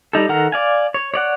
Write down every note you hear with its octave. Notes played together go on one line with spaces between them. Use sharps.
G3 D#4 A4
D#3 A4 F#5 A#5 F6
D5 F5 G#5
C#5
C#5 D5 F#5